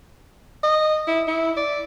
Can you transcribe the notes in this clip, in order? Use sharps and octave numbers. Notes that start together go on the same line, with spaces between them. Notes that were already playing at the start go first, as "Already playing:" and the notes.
D#5
E4
E4
D5